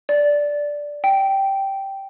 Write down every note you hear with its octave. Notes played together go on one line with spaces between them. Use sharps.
D5
G5